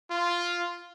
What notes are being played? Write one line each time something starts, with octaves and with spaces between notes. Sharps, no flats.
F4